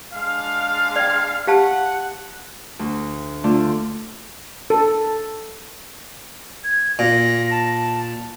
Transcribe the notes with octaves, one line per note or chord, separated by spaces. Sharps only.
G#3 D4 F5
D5 G5
G4 F5 F#5 A5
D2
D3 A3 D4 F4
A4
G#6
A#2 A#6
A5